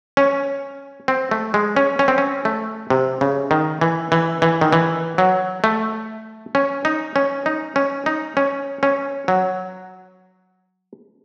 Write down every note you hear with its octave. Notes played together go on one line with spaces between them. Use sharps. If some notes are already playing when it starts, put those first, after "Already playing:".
C#4
C4
A3
G#3
C#4
C#4
C4
C#4
A3
C3
C#3
D#3
E3
E3
E3
D#3
E3
F#3
A3
C#4
D#4
C#4
D#4
C#4
D#4
C#4
C#4
F#3